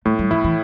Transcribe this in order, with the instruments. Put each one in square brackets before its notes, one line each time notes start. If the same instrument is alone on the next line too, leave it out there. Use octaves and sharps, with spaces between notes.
[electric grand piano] A2 [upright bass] A3
[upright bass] G3
[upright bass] F3 [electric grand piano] E4
[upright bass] E3